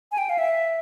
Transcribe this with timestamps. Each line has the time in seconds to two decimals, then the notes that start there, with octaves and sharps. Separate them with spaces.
0.12 G#5
0.18 G5
0.29 F5
0.38 E5